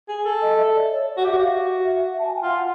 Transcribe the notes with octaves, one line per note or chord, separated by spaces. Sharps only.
G#4
A4
D#5
E5
D5
C#5
F#4
G4 E5
F#4
F5
E5
A5
G#5
G5
F4 F#5